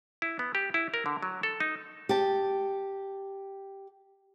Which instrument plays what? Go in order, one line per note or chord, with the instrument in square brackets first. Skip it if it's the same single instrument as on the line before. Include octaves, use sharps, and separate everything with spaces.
[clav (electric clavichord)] E4
B3
G4
E4
A#4
D3
F#3
A4
D#4
[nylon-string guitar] G4 A5